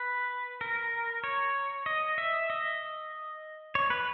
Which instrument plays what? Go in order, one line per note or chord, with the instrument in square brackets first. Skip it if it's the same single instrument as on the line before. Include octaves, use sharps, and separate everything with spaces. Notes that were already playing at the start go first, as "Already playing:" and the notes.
Already playing: [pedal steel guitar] B4
A#4
C#5
D#5
E5
D#5
C#5
B4